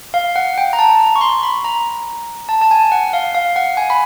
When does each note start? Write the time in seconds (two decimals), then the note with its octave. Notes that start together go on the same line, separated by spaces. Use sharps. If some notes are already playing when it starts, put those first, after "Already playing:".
0.14 F5
0.36 F#5
0.58 G5
0.73 A#5
0.79 A5
0.99 A#5
1.16 C#6
1.21 C6
1.43 B5
1.64 A#5
2.49 A5
2.61 A5
2.71 G#5
2.92 F#5
3.13 F5
3.35 F5
3.56 F#5
3.77 G#5
3.90 B5